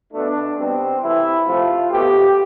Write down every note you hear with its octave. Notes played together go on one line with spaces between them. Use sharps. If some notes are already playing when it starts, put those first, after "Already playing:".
B2 A3 D4
B2 G3 C4
C3 E3 A3 E4
C3 F3 A3 F4
B2 A3 G4